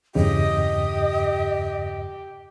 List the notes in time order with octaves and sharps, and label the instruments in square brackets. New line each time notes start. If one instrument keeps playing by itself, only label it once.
[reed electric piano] E2 G2 C#3 [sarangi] G4 [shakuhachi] D#5